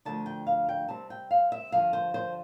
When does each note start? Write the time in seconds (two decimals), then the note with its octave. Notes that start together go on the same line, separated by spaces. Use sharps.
0.05 D2 D3 F3 A5
0.26 G5
0.47 F5
0.69 G5
0.88 C3 G3 C4 A5
1.10 G5
1.31 F5
1.52 E5
1.72 G2 D3 F3 F5
1.93 C5
2.14 C5